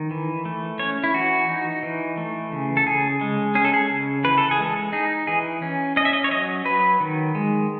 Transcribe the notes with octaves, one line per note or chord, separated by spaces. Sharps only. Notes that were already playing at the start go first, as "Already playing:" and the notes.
Already playing: D#3
E3
A3
C#4 C#5
E4
E3 F#4
D#4
E3
A3
C#3
A4
C#3 G#4
G#3
C#4 G#4
A4
G#4
C#3
E3 B4
A4
G#4
G#3
A4
D#4 G#4
E3 G#4
C#4
C#4 D#5
E5
D#5
C#5
F#3 D#5
F#3 B4
D#3
G#3